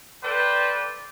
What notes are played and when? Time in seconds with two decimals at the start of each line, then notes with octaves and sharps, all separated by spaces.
0.23 A4 B4 C5 D5 G5